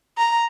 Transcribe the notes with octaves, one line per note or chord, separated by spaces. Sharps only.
A#5